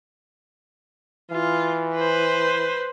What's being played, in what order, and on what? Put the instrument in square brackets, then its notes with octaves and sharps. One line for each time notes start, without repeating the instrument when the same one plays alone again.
[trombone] E3 [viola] F4
[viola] B4 C5